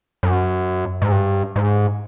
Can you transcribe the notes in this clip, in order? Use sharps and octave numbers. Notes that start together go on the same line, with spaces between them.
F#2
G#2
G2
G#2